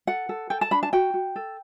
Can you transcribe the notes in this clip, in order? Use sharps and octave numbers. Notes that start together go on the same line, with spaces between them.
A4 F#5
A4
A4 G5
A5
D4 B5
A5
F#4 G5
F#4
A4